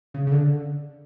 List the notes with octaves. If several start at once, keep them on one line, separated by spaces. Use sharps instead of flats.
C#3
C#3
D3